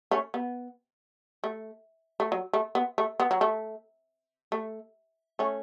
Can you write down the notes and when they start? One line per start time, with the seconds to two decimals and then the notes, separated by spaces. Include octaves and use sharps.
0.11 A3 C#4
0.34 B3
1.44 A3
2.20 A3
2.32 F#3
2.53 A3
2.75 B3
2.98 A3
3.20 B3
3.31 F#3
3.41 A3
4.52 A3
5.39 A3 C#4